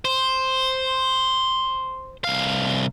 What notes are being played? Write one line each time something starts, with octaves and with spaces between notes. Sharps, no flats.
C5
C2 F5